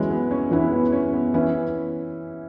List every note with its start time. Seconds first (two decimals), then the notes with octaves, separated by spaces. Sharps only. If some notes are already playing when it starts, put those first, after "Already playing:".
Already playing: E3 F#3 G#3 C#4 E4 B4
0.11 B3
0.31 C#4
0.51 E3 B3 C#4 E4 B4
0.72 B3
0.92 C#4
1.13 B3
1.34 E3 B3 C#4 E4 B4